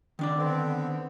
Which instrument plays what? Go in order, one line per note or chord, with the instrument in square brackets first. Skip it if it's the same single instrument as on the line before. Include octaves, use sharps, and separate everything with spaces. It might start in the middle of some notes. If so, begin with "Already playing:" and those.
[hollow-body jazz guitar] D#3 D4 D5
[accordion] D3 B3 C4